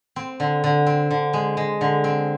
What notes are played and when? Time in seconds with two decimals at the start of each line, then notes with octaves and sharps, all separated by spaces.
0.16 C4
0.40 D3
0.64 D3
0.86 C4
1.11 D3
1.33 G#3
1.57 G#3
1.81 D3
2.04 C4